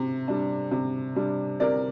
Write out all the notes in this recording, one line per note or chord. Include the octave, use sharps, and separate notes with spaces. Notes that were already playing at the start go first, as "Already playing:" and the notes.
Already playing: C3
G3 D4
C3
G3 D4
C3 A#4 D5